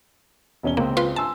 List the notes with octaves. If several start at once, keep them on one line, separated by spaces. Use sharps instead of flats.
E1 C#4 G7
C#2 A#3 C4
F4 B4 C6
G#5 A5 C6 E6